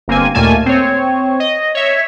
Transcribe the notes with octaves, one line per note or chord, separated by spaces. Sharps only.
G1 A#3 C4 G#5
D#2 A#2 A3 A#3 G#5 A5
C4 C#5
D#5
C#5 E5